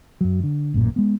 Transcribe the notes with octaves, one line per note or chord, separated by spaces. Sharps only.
F#2 F#3
D3
A1 F#2 A#2
G#3 B3